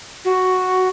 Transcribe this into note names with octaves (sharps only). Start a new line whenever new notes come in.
F#4